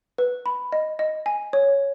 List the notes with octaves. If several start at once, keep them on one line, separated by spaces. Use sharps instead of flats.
B4
B5
D#5
D#5
G#5
C#5